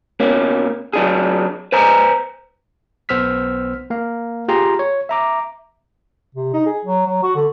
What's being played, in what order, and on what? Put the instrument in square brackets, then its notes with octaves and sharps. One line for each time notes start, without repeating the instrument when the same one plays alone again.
[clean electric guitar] B2 A#3 C#4
F#3 D4 G#4
B4 C5 G#5 A#5
[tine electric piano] B1 B3 C5 E6 F6 B6
A#3 F5
F4 G4 G#4 G5 A#5 C6
C#5
E5 A#5 D6
[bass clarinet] C3
D#4
G#4
F#3
F#3
F#4
D3